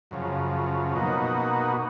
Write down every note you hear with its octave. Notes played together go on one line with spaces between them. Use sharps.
F#2 C#3 F3
B2 A#3 D#4 F#4